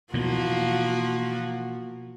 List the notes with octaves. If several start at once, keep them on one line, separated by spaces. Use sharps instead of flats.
B2 E3 F3 A#3 F#4